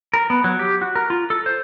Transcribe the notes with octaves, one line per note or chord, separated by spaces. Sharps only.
A#4
B3
F#3
G4
F#4
A#4
F4
A4
C5